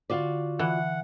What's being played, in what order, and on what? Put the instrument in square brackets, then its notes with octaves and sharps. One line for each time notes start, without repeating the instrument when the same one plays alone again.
[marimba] D3 [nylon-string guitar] F4 F#4 D5
[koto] E3 [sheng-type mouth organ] F#5